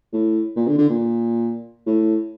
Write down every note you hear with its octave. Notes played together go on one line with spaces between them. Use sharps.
A2
A#2
D3
D3
A#2
A2